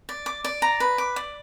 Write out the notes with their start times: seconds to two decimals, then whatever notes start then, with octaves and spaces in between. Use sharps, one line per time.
0.09 D5
0.26 D6
0.45 D5
0.62 A#5
0.80 B4
0.98 D6
1.16 D5